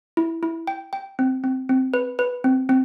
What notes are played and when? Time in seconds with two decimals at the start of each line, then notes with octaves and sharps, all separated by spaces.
0.17 E4
0.43 E4
0.67 G5
0.93 G5
1.19 C4
1.44 C4
1.69 C4
1.94 B4
2.19 B4
2.44 C4
2.69 C4